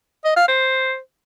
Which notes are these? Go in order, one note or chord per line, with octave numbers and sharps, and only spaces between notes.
D#5
F5
C5